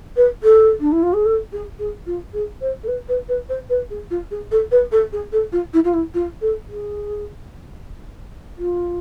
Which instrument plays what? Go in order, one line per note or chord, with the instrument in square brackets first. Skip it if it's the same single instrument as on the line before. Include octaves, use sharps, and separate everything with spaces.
[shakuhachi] B4
A4
D4
E4
F4
G#4
A4
G#4
G#4
F4
G#4
C5
A4
B4
B4
B4
C5
B4
G#4
F4
G#4
A4
B4
A4
G#4
A4
F4
E4
F4
E4
F4
A4
G#4
F4